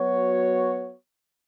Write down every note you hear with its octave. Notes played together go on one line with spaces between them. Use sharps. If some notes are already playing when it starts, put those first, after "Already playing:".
Already playing: F#3 B3 F#4 C#5